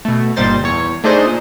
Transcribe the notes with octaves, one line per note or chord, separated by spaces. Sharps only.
B2 A3
G1 A#2 G3 D#4 C5 A6
E2 C#5
A3 D4 D#4 G#4 C5 D#5
A#2